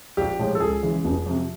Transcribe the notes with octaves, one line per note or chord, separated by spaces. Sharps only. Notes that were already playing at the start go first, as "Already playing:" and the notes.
A#1 G4
A2 F3 G#3
A4
C#2 G#4
C#3 E3 G#3
F1
F2 C3